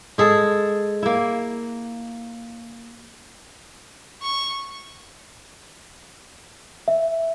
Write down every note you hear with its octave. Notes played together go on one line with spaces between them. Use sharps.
G#3 G#4 A4
A#3 E4
C#6
E5